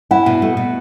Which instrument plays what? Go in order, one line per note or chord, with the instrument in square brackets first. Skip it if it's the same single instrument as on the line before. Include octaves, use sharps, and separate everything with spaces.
[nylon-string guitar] E4 [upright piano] F#5
[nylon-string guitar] B2
A3
B2